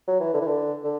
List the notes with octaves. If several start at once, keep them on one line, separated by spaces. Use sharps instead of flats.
F#3
E3
D3
E3
D3
D3